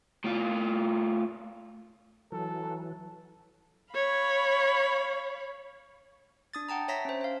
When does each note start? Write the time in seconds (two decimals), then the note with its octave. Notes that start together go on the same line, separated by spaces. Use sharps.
0.24 A2 F4
2.32 E3 F#3 A4
3.93 C#5 F5 B5
6.54 D4 D#6 A6
6.69 F#5 G5 A5 A#5
6.88 C#5 E5 A5 A#5 A#6 B6
7.05 C#4 C5
7.21 C5 F5